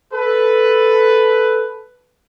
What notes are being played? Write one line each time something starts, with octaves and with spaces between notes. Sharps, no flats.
A4 B4